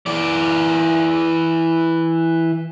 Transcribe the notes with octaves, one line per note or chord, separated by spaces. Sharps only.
E3 D5